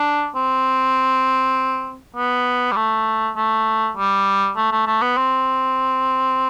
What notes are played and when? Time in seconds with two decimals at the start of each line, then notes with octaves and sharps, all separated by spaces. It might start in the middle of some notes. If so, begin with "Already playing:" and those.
Already playing: D4
0.35 C4
2.16 B3
2.72 G3
2.76 A3
3.36 A3
3.97 G3
4.57 A3
4.72 A3
4.87 A3
5.02 B3
5.17 C4